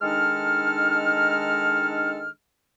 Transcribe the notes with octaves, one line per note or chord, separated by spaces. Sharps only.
D#3 G#3 D4 D#4 A4 F6